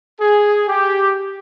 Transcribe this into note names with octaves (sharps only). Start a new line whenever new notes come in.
G#4
G4